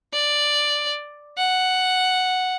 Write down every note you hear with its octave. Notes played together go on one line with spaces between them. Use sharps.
D5
F#5